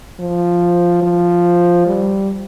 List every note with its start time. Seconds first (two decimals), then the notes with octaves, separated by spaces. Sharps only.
0.20 F3
1.03 F3
1.87 G3